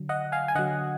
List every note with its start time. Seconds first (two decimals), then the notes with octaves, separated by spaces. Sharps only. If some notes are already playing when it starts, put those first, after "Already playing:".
Already playing: D3 F#3
0.09 D#5 F#5
0.32 F5 G#5
0.48 G#5
0.55 D3 F#3 D#5 F#5